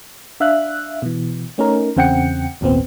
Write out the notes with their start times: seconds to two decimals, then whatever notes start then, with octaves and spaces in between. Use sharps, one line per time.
0.40 D4 E5 F5 F#6
1.02 B2 E3
1.58 A3 C#4 D#4 A#4
1.96 E2 C#3 C4 F#5 G5 C#7
2.61 G#1 D#2 A#2 B3 C4